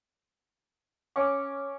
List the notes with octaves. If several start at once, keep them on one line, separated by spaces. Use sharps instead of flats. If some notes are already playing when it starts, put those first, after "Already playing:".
C#4 C#6 D6